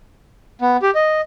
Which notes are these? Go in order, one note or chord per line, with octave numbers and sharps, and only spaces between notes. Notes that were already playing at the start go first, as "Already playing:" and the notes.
B3
G4
D#5